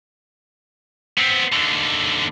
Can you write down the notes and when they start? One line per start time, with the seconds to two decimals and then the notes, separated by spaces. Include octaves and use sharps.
1.18 B3 C4
1.53 D#2 D3